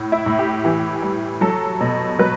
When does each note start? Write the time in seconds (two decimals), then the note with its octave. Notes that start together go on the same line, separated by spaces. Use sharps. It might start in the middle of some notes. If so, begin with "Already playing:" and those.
Already playing: A2
0.12 E4
0.26 A2
0.39 G4
0.65 E3
1.02 G3
1.41 F#3 A4
1.81 B2
2.19 F#3 B4